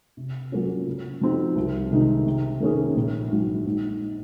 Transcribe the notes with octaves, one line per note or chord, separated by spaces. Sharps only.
C3
F#3 A#3 C#4 F4
C#3
F3 C4 D#4 F#4
C2
C3 D#3 G#3 D#4
C3
D#3 A#3 C#4 G#4
A#1
G#2 F#3
G#2